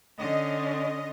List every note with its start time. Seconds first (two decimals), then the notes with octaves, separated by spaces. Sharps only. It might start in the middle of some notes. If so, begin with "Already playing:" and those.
0.18 D3 C#4 D#5